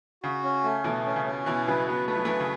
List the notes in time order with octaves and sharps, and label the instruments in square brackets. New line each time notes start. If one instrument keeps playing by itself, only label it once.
[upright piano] C#3 [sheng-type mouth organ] F#4
[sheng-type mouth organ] C#4
A3
[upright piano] B2 E3 [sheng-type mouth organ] A3
[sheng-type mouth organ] C#4
[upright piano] C#3
[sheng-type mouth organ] C#4
[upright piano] B2 E3 [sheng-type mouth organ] E4
[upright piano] C#3 F#3 [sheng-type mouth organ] B4
[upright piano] F#3 B3 [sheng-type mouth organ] B4
[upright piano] A3 [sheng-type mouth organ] B4
[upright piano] F#3
[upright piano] E3 A3 [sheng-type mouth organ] B4
[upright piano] C#3